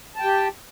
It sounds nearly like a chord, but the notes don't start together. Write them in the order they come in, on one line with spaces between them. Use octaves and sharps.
A5 G5 G4